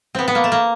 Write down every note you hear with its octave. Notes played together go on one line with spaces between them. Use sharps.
B3 C4
B3
A#3
A3
A#3